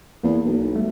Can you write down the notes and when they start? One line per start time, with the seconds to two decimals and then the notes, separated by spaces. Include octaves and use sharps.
0.23 E2 A#3
0.45 B1
0.75 G3 A3